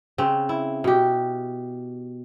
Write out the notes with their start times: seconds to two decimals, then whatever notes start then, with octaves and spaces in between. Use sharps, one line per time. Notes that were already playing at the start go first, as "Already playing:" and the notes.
0.18 C#3 C4
0.49 E4
0.84 B2 G4